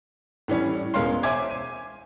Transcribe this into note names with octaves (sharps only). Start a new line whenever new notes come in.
A2 E3 G3 C#4
E1 G#3 C#4 A#4 F5 C6
C5 C#5 E5 G#5 D6 G#6
D#7